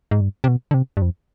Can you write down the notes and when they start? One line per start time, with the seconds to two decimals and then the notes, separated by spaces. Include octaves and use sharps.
0.11 G#2
0.21 G2
0.44 C3
0.48 B2
0.71 D3
0.74 C3
0.97 G2
1.02 F2